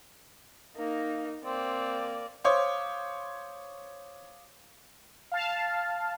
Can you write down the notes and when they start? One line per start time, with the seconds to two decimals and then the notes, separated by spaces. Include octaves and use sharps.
0.77 A#3 D#4
1.45 A#3 C4 D5
2.44 C5 C#5 F5 D6 D#6
5.32 F5 A5